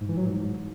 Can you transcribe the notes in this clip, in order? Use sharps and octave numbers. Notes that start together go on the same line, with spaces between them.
G#2
E3
F#3
G#2